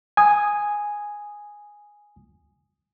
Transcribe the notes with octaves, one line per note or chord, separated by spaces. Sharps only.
G#5 D#6